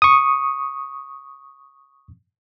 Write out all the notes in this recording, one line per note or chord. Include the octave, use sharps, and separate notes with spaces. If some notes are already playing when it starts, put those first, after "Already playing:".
C#6 D#6